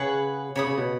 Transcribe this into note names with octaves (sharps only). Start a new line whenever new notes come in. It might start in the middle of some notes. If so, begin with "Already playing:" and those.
Already playing: C#3 G#4 B4 F#5 C#6
C#3 C#5 B5 D#6
C#3
B2